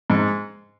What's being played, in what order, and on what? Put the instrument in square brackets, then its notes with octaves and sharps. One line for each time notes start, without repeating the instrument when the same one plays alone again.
[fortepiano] G#2